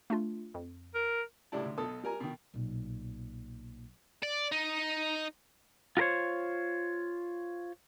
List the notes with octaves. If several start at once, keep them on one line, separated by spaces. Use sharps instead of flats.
A3 D4 F4
F2
A#4
C#2 A2 G3 D4 E4 A5
D2
B1 B2 A4 A5 D#6
G3 A#4 G#5 A#5
B2 D#3
B1 A#2
D5
D#4
F4 F#4 A#4 C5 C#5